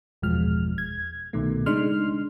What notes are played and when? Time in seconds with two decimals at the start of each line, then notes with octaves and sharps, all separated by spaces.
0.22 G1 E2 B2 F3 G#3 F6
0.78 G#6
1.33 C2 B2 D#3 A3
1.66 C#3 G#3 D4 D#4 C6 F6